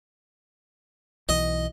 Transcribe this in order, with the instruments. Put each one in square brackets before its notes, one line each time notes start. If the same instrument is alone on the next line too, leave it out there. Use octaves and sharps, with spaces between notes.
[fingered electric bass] B1 E3 [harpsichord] D#5